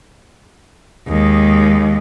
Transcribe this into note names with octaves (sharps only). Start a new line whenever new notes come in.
D#2 G#3